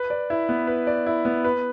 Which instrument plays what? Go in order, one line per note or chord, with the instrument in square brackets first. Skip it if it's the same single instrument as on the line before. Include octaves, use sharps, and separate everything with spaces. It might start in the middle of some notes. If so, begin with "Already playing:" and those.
Already playing: [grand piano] B4
D5
E4
B3
B4
D5
E4
B3
B4